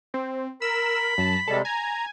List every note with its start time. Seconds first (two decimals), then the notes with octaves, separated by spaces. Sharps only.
0.14 C4
0.62 A#4 B5 E6
1.18 F#2 A5
1.48 C3 G3 G#3 A4
1.65 G#5 A#5